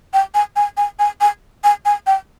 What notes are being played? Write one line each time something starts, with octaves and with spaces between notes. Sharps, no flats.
G5
G#5
G#5
G#5
G#5
G#5
G#5
G#5
G5